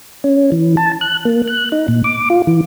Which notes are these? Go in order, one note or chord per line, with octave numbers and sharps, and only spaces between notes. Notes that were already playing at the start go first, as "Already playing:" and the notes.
C#4
E3
A5
F#6
A#3
F#6
D#4
A#2
D6
F4
E3